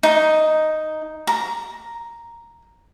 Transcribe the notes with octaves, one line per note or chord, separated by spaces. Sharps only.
D#4
A#5